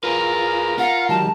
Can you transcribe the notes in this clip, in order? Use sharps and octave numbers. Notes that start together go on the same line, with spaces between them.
F4 G#4 A#4 B4
F4 F#5
D#3 F#3 G3 A5